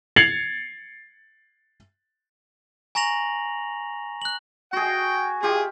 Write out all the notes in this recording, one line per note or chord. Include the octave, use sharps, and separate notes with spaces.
G#6 A6 C7 C#7 F7 F#7
G#5 A#5 C#6 A#6 F7 F#7
F#6 F#7
F#4 G#4 G5
F4 G4 G#4